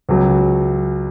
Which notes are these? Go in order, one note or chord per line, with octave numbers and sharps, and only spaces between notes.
C#2 C#3 F#3